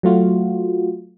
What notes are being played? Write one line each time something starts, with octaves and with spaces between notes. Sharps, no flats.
F#3 A3 F4 F#4